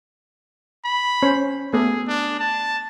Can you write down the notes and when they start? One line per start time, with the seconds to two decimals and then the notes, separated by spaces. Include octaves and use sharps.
0.85 B5
1.22 C#4 C5
1.73 A3 B3 G#4 A4
2.07 D4
2.39 A5